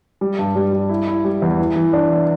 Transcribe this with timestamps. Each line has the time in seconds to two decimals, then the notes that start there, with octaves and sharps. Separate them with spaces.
0.21 G3
0.39 G2
0.56 G3
0.73 G3
0.89 E4
1.08 E4
1.24 G3
1.42 E2
1.59 E3
1.76 E3
1.93 D4
2.10 E3